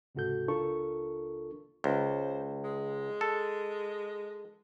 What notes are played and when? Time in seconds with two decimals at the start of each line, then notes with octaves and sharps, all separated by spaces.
0.15 C#2 G#2 C3 F#4 A4 G6
0.48 C#2 D4 F4 A4 A#4 C#6
1.84 C#2 C5
2.64 G#3
3.21 A4